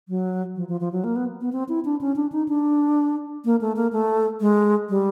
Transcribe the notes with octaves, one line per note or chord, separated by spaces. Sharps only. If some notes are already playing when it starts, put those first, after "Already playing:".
F#3
F3
F3
F3
F#3
A#3
B3
B3
C4
E4
D4
C#4
D4
D#4
D4
A#3
A3
A#3
A3
G#3
G3